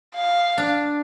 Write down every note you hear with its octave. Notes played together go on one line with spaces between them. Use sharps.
F5
D4